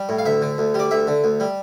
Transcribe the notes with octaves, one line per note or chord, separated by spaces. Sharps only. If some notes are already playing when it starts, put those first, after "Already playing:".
Already playing: G3
A2
F5
D2 E5
D3
D2
G3 D5
D2 E5
D3
D2
G3